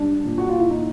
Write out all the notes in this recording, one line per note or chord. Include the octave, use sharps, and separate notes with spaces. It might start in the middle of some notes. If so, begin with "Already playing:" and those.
Already playing: G3 D4
A#2
F#4
F4
E4
A#2 D#4